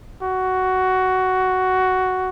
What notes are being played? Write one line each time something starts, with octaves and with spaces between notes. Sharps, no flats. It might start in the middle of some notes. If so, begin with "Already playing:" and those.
F#4